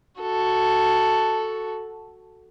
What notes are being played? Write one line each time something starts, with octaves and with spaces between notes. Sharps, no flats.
F#4 A4